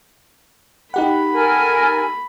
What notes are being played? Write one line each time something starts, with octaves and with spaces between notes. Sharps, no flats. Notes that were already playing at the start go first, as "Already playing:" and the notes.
D#4 G4 F#5 B5
A4 A#4 G#5